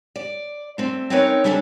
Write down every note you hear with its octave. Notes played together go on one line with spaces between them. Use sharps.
D5
A3 C4
C4 C#4 D#4 A#4 B4 C#5
G3 C#4 D4 A4 E5